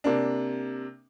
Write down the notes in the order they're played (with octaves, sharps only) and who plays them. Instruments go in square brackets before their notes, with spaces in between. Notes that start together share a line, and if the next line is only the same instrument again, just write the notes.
[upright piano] C3 A#3 D4